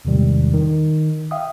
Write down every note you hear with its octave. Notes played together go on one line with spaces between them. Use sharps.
E2 A2 C3 D#3 G3 G#3
D#3
E5 F5 G5 D#6